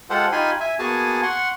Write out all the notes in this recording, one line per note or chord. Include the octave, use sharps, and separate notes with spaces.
G#3 F4 G4 A4 C5 F#5
D#4 F4 G4 G#5 B5 C6
E5 G#5
A#3 B3 F#4 G#4 G#5 A5
F#5 C6 C#6